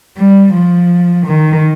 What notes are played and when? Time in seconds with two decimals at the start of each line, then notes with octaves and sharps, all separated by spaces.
0.17 G3
0.53 F3
1.26 D#3